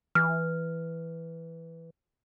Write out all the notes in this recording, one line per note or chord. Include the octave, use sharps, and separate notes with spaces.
E3 F6